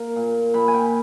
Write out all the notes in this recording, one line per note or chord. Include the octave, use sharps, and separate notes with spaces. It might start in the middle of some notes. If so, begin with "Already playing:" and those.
Already playing: A#3
A#2
A#2 B5
G#5
G5